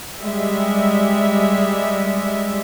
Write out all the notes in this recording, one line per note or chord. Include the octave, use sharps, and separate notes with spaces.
G3 G#3 E5